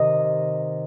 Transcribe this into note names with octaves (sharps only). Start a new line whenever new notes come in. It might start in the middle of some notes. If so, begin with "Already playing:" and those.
Already playing: C3 D#3 D#5